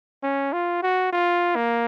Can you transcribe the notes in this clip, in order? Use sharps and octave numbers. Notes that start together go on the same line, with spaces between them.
C#4
F4
F#4
F4
A#3